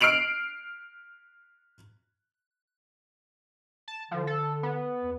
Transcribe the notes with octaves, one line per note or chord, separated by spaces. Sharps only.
F6 C7 D7 F7 F#7
A5
D3 F3
A4
B3
E2